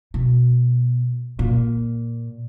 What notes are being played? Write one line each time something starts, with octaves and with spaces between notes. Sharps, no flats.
B2
A#2